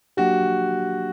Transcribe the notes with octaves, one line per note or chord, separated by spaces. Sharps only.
F#3 A#3 D4 F#4 G4